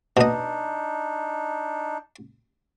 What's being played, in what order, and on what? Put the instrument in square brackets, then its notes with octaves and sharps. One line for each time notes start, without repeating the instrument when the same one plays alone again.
[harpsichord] B2 D#5 [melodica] D4 D#4